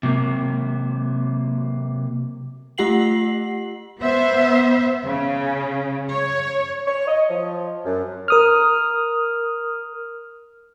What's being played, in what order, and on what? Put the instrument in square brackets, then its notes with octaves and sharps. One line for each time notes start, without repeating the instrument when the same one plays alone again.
[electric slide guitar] C3 F#3 A#3
[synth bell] A3 F4 G4 F#5 C7 F#7
[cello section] B3 C5 E5
C#3
C#5
[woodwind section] C#5
D#5
F3
F#2
[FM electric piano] A#4 D#6 F6